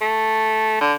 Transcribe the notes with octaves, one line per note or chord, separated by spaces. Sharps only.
A3
D3